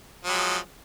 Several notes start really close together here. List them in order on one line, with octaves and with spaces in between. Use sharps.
F#3 G#3 F3